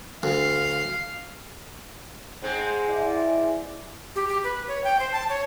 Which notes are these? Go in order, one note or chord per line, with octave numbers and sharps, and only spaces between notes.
D2 F5
G#2 G#3 C4
E4 D5
G4
G4
B4
C#5
G5
C5
A5
C#5